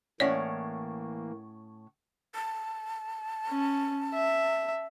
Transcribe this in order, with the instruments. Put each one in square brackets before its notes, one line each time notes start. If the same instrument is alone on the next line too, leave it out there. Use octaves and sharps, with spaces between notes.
[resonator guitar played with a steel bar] A2 C#4 F#5 [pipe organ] E3 A#3 [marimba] C#5 D5
[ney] A5
[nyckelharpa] C#4
E5